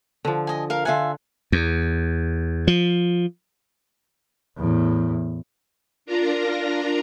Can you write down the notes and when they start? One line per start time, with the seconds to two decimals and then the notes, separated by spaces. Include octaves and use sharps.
0.25 D3 F3
0.47 D#5 G#5
0.70 A#4 F5
0.85 D3 F4 E5 F#5 G#5
1.52 E2
2.68 F3
4.57 E2 A2
6.06 D4 F4 A#4 A#5